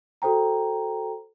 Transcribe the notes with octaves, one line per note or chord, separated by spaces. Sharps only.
F#4 A4 C5 G5 A#5